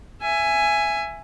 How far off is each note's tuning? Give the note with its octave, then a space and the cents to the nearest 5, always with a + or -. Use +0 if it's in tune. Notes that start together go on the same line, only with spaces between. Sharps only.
E5 +20 G#5 +0